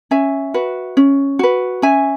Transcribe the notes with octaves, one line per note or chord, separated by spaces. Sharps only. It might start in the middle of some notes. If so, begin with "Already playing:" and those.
C#4 E5 G#5
F#4 B4
C#4
F#4 B4
C#4 E5 G#5